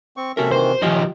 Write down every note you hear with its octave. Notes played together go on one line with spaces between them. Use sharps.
C4 C#6
C3 C#4 F#4 A4 A#4 E5
D#3 E3 C5
D#3 F3 C#4 F4 G4 D#5